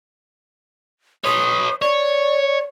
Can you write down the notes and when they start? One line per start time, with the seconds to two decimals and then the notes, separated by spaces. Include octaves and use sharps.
1.25 B4 C#5 D#6
1.82 C#5 D5